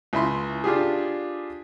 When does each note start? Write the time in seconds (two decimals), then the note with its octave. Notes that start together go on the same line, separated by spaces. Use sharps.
0.13 C#2 E4 E5 B5 C6
0.64 D4 F4 G4 G#4